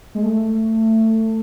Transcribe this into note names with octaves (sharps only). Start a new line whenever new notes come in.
G#3
A3